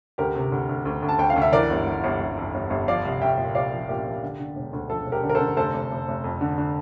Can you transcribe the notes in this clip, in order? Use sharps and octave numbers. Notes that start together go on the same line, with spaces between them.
D2 G4 A#4
C3
D2
D2
D2
D2
A5
D2 G5
F5
D2
E5
E3 A#4 D5
G1
G1
G1
G1
F2
G1
G1
F3 D5 F5
C2
C2 E5 G5
A#2
C2 D5 F5
F3
A#2 G4
F3
D3
D3
E1
D2
F3 A4
E1
G4 A#4
D3
A#4
A4 C5
D3
F1 A4 C5
F1
F1
F1
F2
D3
D3